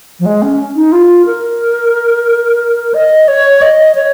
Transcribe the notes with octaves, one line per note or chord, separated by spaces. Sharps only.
F3
G#3
C#4
D#4
F4
A#4
D#5
C#5
D#5
C#5